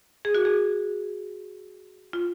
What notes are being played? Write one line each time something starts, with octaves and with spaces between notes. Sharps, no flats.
G#4
F#4
G#4
F4